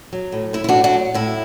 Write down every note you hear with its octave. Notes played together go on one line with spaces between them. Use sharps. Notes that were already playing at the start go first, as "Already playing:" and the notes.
F#3
A2
A3 E4
E4
A2 D4 F#4
D4 F#4
F#3
A2 E4